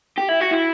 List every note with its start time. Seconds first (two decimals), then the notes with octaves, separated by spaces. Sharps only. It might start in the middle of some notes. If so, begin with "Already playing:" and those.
0.18 G4
0.29 E4
0.41 F#4
0.52 E4